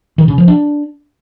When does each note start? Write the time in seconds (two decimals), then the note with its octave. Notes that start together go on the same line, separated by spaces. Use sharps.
0.18 D#3
0.28 C#3
0.38 F3
0.48 D4